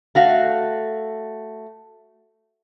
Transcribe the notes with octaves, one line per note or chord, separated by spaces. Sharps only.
A3 F#4 F5